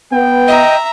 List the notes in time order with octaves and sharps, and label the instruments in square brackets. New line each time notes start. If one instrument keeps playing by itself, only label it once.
[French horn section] B3 [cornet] G5
[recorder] D#5 [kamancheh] E5 A#5